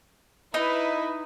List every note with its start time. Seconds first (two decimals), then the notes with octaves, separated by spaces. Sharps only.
0.54 D#4 E4 B4